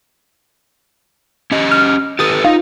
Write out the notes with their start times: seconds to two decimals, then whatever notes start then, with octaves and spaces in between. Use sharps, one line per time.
1.52 C#4 G4 D#5
1.71 F6
2.19 G4 A4 B4 D#6 A6
2.44 D#4 F4